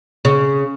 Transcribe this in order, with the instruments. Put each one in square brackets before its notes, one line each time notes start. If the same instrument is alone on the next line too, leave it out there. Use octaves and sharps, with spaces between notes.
[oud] C#3